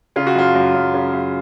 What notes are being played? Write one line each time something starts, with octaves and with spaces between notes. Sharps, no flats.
C#3 F4
F#4
F#2 F4
F#2
F#2
C#3
F#2